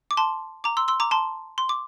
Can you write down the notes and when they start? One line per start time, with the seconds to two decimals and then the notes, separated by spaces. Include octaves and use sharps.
0.11 D6
0.17 A5 C6
0.64 A#5 D6
0.77 C6 E6
0.88 C6 E6
1.00 A#5 D6
1.11 A5 C6
1.58 C6
1.69 D6